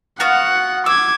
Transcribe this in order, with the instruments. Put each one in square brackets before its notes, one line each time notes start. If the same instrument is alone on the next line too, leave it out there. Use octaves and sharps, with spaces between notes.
[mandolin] B3 F#4 F5 [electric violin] F#5
[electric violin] D6 G#6 [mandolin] E6